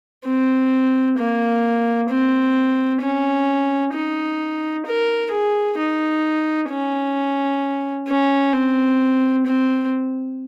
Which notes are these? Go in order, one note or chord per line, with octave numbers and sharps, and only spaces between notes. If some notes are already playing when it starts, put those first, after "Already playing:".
C4
A#3
C4
C#4
D#4
A#4
G#4
D#4
C#4
C#4
C4
C4